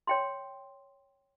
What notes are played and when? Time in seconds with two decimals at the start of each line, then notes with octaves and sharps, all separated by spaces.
0.07 C#5 G5 C6